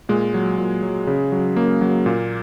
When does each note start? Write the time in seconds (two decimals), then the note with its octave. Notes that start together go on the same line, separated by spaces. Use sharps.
0.09 A#2 G#3
0.34 F#3
0.58 A#2
0.83 F#3
1.07 C#3
1.32 F#3
1.56 C#3 A#3
1.81 F#3
2.06 A#2